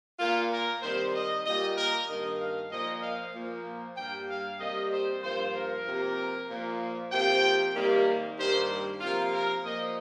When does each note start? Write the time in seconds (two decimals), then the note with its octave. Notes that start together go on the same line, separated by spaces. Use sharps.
0.19 A#2 A#3 F4
0.51 A#4
0.82 C3 D#3 G3 C5
1.14 D#5
1.45 A#2 G3 A#3 D#5
1.76 A#4
2.09 G2 D#3 A#3 D#5
2.39 F5
2.70 A#2 F3 A#3 D#5
3.02 F5
3.34 A#2 F3 A#3
3.96 G2 G3 A#3 G5
4.29 F5
4.59 C3 G3 A#3 D#5
4.91 C5
5.22 G2 F3 A#3 C5
5.54 A#4
5.86 C3 F3 A#3
6.49 A#2 F3 A#3
7.11 C3 F3 A#3 G5
7.74 C3 D#3 G3 A#3
8.38 G2 D#3 G3 A#3 C5
9.00 C3 F3 A#3 F4
9.32 A#4
9.63 A#2 F3 A#3 D#5